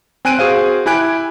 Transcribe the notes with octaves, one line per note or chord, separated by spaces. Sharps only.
C4 G#5 F#6 D7 D#7
F#4 G#4 C5 F5
E4 G4 G#5 F#6 D7